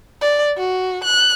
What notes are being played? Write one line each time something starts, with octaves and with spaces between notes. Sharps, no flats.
D5
F#4
F#6